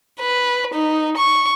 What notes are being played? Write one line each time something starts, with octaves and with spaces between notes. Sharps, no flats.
B4
D#4
C#6